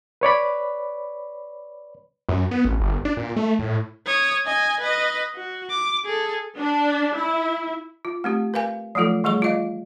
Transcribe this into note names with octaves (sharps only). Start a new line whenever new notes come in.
B4 C#5 D5 B5
F#2
B3
A1
G1
D4
A#2
A3
A2
C#5 D#6
D#5 G#5
B4 D#5
F#4
D6
G#4 A4
D4
E4
F4
A3 C4 G4
A#4 B4 F5 G#5
F3 F#3 A3 F4 A4
E3 G3 A3 G#4 C#6
F4 D#5 F5